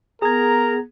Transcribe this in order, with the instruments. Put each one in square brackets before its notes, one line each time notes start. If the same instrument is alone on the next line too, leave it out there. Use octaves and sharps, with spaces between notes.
[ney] B3 [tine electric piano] G#4 G#6 [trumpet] A#4 [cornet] A#5